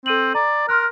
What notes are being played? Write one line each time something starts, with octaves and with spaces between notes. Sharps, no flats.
C4 A4 D#7 F#7
D5 A#5
A#4 C6 F6 F#6